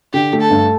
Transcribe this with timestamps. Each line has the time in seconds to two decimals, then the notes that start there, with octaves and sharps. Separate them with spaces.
0.13 D3 G4
0.33 A3
0.41 A4
0.51 G2